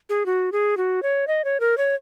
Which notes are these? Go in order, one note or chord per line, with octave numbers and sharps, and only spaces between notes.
G#4
F#4
G#4
F#4
C#5
D#5
C#5
A#4
C#5